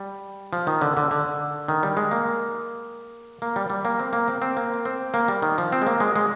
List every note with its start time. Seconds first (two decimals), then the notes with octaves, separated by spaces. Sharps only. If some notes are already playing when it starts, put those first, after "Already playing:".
Already playing: G3
0.53 F3
0.67 D#3
0.81 D3
0.97 D3
1.11 D3
1.68 D#3
1.83 G3
1.97 G#3
2.11 A#3
3.42 A#3
3.56 G3
3.70 G3
3.85 A#3
3.99 C4
4.13 A#3
4.28 C4
4.42 C4
4.57 A#3
4.85 C4
5.14 A#3
5.28 G3
5.42 D#3
5.58 F3
5.72 C4
5.82 G#3
5.87 A#3
6.00 G#3
6.16 G#3